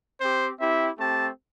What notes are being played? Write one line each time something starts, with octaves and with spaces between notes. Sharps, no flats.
C4 G4 C5
C4 E4 G4 E5
A3 C4 G4 A5